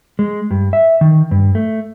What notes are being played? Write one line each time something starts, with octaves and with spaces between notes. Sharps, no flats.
G#3
G2
E5
D#3
G2
A3